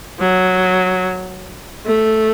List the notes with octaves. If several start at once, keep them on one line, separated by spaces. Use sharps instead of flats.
F#3
A3